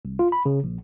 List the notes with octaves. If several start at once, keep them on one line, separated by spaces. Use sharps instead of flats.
C2
F4
B5
C#3
A#1